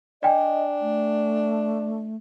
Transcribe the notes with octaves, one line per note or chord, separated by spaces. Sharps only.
D4 D5 D#5 G5 G#5
A3